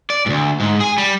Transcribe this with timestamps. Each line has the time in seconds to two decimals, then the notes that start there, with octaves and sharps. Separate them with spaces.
0.10 D5
0.26 D2 G#2
0.60 G#2
0.80 G#4 G#5
0.98 G3